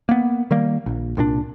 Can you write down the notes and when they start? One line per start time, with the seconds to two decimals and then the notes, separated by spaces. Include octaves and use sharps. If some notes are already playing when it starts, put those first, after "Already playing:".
0.09 A#3 B3
0.51 D#3 G3 A#3
0.86 A#1
1.17 C2 A#2 C4 D4